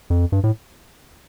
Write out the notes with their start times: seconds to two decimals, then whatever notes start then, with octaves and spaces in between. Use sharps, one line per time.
0.10 F2
0.32 G2
0.44 A2